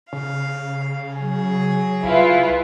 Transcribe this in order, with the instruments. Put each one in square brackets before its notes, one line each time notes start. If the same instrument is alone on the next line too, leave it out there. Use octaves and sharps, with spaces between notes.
[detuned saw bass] C#3 [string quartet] F5
[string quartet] F#3 G#4
[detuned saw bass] C2 [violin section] E4 F4 B4